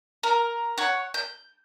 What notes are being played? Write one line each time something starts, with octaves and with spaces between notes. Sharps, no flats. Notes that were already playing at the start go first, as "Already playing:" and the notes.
A#4
C#5 F#5
G6